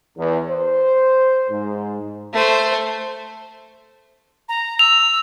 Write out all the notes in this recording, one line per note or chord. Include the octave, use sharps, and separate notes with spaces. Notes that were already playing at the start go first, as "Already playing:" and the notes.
E2
C5
G#2
A3 C5
A#5
E6 F7